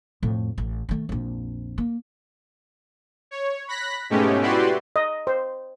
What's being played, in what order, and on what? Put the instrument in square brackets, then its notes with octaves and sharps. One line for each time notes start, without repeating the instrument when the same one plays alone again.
[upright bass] F2 A2
A1
D#3 A3
A#1 F2
A#3
[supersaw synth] C#5
B5 F#6 A#6 B6
G#2 B2 G#3 A3 C#4 G4
E4 F#4 G4 B4 D5 C6
[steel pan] D#5
C5